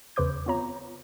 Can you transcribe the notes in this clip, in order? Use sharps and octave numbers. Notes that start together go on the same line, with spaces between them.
E2 C#3 B4 C5 D6 G6
B3 C4 F4 C#5 A#5